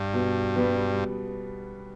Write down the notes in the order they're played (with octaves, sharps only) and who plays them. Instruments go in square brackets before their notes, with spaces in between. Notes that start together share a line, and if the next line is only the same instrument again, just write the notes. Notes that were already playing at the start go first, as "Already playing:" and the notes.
Already playing: [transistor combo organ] G2
[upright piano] B2
G3 B3